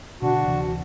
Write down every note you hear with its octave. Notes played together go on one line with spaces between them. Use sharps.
B2 D3 D4 F#4
D2 C3 E3